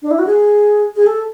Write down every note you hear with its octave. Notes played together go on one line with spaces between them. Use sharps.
D4
E4
F#4
G#4
G#4
A4